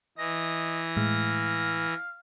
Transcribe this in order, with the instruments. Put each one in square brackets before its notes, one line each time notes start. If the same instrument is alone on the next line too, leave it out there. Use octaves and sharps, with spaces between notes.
[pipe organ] E3 A#6 [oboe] D#5
[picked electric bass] A2 G#3 [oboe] F5